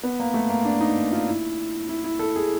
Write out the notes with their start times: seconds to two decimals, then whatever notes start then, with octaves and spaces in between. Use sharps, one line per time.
0.03 B3
0.20 A#3
0.34 A3
0.49 A#3
0.65 D4
0.81 D#4
1.12 F4
1.28 E4
1.89 E4
2.04 E4
2.19 A4
2.36 G#4